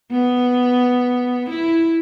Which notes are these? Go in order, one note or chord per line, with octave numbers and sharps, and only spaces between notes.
B3
E4